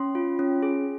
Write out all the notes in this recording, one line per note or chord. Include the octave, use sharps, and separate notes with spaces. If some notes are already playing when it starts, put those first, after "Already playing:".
Already playing: C#4 C6
F4
C#4
G#4